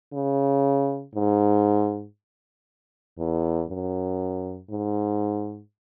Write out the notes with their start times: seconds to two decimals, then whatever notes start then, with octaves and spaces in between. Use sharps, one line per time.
0.13 C#3
1.15 G#2
3.18 E2
3.69 F#2
4.70 G#2